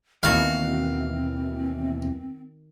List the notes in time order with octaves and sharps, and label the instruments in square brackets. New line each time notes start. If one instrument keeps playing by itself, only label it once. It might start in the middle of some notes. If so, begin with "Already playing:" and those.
[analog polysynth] D#2 B2 E3 [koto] D#3 F#4 [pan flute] C4 [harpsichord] F5